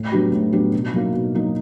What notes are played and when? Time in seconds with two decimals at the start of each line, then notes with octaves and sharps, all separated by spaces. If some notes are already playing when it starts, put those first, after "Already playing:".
Already playing: A2
0.12 F#3 B3 D4 G4
0.32 A2
0.52 F#3 B3 D4 G4
0.73 B2
0.93 F#3 A#3 D#4
1.13 B2
1.34 F#3 A#3 D#4